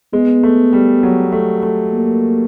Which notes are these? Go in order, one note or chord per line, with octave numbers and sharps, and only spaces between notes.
G#3 B3
A3
G3
F#3
A3
A3
A#3